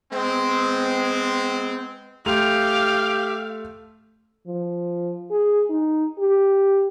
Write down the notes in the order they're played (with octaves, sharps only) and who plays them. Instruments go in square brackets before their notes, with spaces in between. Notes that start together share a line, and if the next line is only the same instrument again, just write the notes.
[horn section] G#3 B3 C4
[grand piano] A3 C6 F7 [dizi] G4 [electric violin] F5
[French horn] F3
G#4
D#4
G4